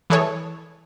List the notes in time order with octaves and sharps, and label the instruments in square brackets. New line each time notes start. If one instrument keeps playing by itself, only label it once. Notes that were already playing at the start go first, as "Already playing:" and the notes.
[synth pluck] E3 E4 G#4 A4 C#5